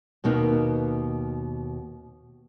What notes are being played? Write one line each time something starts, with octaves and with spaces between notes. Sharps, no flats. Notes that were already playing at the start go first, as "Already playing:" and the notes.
D#2 B2 A#3 B3 D#4